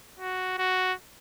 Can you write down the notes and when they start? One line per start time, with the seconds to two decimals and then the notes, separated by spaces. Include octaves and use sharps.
0.20 F#4
0.58 F#4